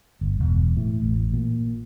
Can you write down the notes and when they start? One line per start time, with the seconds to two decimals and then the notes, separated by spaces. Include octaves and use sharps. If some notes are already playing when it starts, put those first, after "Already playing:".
0.21 G1
0.40 E1
0.77 A2
1.02 A1
1.33 A#2